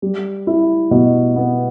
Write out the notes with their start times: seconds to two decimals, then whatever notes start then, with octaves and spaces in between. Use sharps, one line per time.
0.02 G3
0.47 E4
0.91 B2
1.36 B3